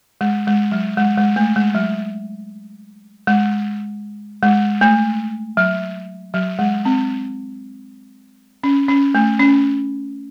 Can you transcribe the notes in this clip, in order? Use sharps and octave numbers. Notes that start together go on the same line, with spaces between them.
G#3
G#3
F#3
G#3
G#3
A3
G#3
F#3
G#3
G#3
A3
F#3
F#3
G#3
C4
C#4
C#4
A3
C#4